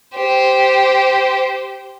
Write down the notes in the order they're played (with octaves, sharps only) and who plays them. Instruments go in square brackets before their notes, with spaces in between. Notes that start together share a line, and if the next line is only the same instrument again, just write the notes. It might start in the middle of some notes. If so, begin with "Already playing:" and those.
[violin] G4 C5